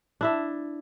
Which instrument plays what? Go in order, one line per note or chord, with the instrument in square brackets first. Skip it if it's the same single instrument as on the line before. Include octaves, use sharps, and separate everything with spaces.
[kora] D4 E4 E5